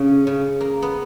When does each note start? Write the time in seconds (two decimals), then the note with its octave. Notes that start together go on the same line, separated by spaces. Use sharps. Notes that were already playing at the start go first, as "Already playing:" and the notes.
Already playing: C#3 C#4
0.27 C#3
0.61 A#3
0.82 B3